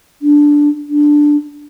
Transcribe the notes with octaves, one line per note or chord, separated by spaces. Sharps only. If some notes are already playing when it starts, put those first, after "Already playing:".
D4
D4